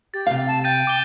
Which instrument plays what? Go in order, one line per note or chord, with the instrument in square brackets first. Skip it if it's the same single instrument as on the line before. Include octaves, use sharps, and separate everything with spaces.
[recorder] G4 [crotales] A6
[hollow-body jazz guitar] C3 F5
[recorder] A5
[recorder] G5 [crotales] G6 A6 D#7
[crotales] D6 G7